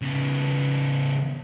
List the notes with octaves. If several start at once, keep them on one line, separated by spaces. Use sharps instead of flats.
C#3 B3